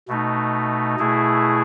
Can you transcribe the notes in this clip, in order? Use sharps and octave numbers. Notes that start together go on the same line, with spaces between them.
B2 A3 D#4
B2 A3 E4 G#4